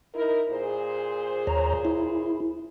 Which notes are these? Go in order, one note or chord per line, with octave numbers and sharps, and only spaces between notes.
D#4 E4 A#4
A#2 G#4 C5
D#2 C#5 A#5
E4